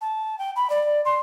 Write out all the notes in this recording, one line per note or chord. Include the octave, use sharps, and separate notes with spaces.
A5
G5
B5
D5
C6